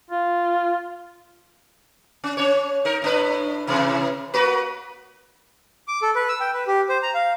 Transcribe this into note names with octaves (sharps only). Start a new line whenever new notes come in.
F4
C#4
C#4 C#5
D#4 A#4
A2 D4 B4
A2 C3 E3
A#3 F#4 B4
D6
A4
B4
E6
G5
B4
G4
C5
A#5
F5